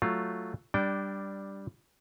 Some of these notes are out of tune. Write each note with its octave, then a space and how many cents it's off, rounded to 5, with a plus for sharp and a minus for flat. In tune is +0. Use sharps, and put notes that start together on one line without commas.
F#3 +0 A3 +0 F4 +0
G3 +0 D4 +0 G5 -20